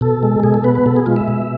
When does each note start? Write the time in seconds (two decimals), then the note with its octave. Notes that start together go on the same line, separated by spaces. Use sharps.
0.01 B2 A4
0.23 G#3
0.43 B2 G#4
0.54 A4
0.64 B3 B4
0.75 B4
0.86 B2 A4
0.96 G#4
1.06 G#3 F4
1.16 E5
1.28 B2